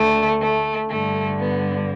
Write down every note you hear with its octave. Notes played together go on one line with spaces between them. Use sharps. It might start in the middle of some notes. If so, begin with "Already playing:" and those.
Already playing: D2 D3 A3
A3
G2 D3 A3
B3